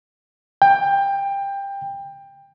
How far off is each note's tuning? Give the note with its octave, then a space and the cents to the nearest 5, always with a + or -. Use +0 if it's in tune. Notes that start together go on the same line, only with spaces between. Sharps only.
G5 +20